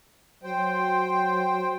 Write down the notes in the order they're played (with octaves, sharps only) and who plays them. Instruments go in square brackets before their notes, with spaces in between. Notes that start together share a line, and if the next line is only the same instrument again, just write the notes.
[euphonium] F#3 [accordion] C5 G5